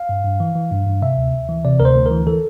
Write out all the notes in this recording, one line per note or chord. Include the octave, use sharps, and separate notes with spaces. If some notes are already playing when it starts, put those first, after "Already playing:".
Already playing: F5
G2
G2
E3
E3
G2
G2
C3 E5
D2
D2
E3
C3 D5
D2 A#4
C5
D2
E3 A#4
E3 A4